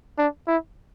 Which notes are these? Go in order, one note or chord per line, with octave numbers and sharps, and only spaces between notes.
D4
E4